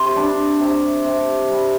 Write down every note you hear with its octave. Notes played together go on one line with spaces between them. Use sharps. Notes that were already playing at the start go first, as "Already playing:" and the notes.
Already playing: C3 C5 D5
G3 D4
C3
C3
G3